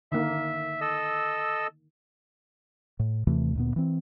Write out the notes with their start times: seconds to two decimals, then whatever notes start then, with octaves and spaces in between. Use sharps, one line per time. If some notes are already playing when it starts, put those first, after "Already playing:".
0.12 D3 D#3 A#3 E5
0.81 A4 D#5 E6
2.99 A2
3.27 D#2 C3 E3 A3
3.55 D2 A#2 B3
3.76 E3 C4